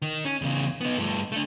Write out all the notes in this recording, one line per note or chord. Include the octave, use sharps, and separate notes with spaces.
D#3
C#4
E2 C#3
B3 D#4
G2 A3
A3 D4